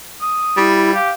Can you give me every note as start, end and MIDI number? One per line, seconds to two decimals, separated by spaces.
0.22 0.69 87
0.57 0.94 55
0.57 0.92 64
0.94 1.11 67
0.94 1.11 77